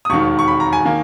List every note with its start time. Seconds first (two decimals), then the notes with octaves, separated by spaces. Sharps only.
0.05 D#6
0.10 E1 D#2 D#3 C#6
0.39 C#6
0.48 B5
0.60 A#5
0.73 G#5
0.85 D#3 A#3